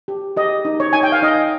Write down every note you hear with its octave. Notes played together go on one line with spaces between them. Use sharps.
G4
G4 D#5
D#4
C#5
D#4 G#5
G5
F5
D#4 D#5